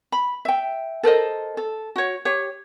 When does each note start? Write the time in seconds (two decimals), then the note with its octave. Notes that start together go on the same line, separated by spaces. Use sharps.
0.12 B5
0.45 E5 G5
1.03 A4 A#4 C5 D#5
1.57 A4
1.96 F#4 C#5
2.25 G4 C#5